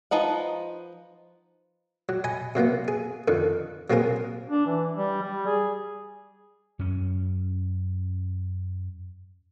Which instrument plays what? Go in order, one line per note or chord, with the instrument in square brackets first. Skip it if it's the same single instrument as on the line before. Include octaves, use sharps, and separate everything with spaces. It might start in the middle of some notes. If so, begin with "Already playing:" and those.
[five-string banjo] F3 D#4 B4 F#5
[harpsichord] F#3
D#5 G#5 B5
C3 F#3 A#3 B3
G#4
F2 D3 D#3
F#3 A#3 C4 G#4 A#4
[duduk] D4
E3
G3
G3
G#4
[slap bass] F#2 C#4